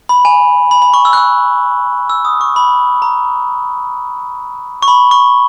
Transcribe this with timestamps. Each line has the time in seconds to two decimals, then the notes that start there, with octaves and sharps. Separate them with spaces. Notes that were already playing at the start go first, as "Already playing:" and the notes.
0.09 B5
0.25 G#5
0.71 B5
0.82 B5
0.94 C#6
1.05 E6
1.13 F#6
1.17 E6
2.10 E6
2.25 D#6
2.41 C#6
2.56 B5
3.02 A#5
4.83 C#6
4.88 B5
5.11 C#6